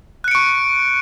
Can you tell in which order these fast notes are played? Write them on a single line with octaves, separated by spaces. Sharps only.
F#6 C#7 D7 C#6